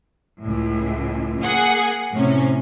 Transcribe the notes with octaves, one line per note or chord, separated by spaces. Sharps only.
C#2 A2
A#3 G#4 F#5 G#5
A2 C3 C#4